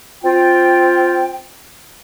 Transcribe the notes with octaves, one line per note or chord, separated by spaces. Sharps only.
C4 F4 G5